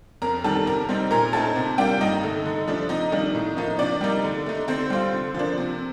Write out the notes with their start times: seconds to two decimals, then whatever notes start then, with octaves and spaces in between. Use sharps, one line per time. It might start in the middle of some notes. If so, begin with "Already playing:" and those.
0.22 F2 A#4 A#5
0.44 D#3 G3 A4 A5
0.66 C3 A#4 A#5
0.89 G3 C4 D#4
1.11 A#2 A#4 A#5
1.33 A3 C4 D#4 A4 A5
1.56 C3
1.78 G3 A#3 D4 F4 G4 G5
2.01 G2 D#4 D#5
2.23 D3 A3
2.46 D3
2.67 F3 A3 D4
2.89 C3 D#4 D#5
3.12 D#3 G3 A#3 D4
3.35 A2
3.57 F3 A#3 D#4
3.79 C3 D4 D5
4.01 G3 A#3 D#4
4.24 D3
4.46 A3 D#4
4.68 D3 C4 C5
4.90 G3 C4 F4
5.13 D3
5.34 F3 A#3 D4
5.58 C3